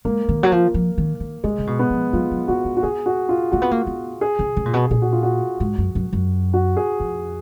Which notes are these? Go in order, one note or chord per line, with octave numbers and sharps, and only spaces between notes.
G#3 A#3
D#3
F#3
F3
F3
D#3
D#3
C#3 G#3
C#3
B2
B3
F3
F#3 F4
F#3
A#3 F#4
A#3
F#4
B3 G#4
F#4
F4
A#3 F#4
B3
A#3
B3
G#4
C#3
C#3
A#2
B2
A#2 G#4
F#4
F4
F#4
G#2
F#2
F#2
F#2
F#4
G#4
F2